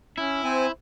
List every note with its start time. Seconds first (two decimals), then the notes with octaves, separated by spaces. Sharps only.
0.18 C#4 E4
0.44 C4 C5 G#5